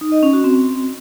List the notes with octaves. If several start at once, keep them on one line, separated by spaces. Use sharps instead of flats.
D#4
D#5
C#4
F#4
C4